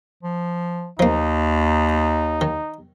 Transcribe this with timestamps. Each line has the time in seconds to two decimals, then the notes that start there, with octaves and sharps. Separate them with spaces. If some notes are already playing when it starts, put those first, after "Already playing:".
0.23 F3
0.99 D#2 F3 A#3 D#4
2.41 D#3